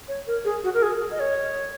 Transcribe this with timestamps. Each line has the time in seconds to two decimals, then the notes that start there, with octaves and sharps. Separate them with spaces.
0.08 C#5
0.27 A#4
0.45 G#4
0.64 F#4
0.74 A#4
0.82 G#4
1.11 D#5
1.20 C#5